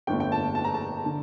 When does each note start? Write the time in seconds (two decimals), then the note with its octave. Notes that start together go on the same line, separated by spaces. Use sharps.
0.07 G1 F2 D3 A3 G5
0.20 G5
0.32 A5
0.55 A5
0.64 A#5
0.74 A5
1.06 D3